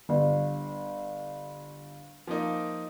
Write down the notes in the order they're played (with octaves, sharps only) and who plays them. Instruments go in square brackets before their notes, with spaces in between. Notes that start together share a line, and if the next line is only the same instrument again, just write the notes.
[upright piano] G1
[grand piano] F3 A#3 D#4